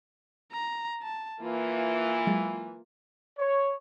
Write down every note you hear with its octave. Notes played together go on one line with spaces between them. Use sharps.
A#5
A5
E3 A#3 F4
F#3 G#3 A6
C#5